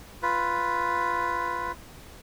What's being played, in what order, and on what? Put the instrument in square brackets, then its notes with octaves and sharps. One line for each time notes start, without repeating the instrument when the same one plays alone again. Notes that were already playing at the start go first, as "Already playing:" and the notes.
[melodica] F4 B4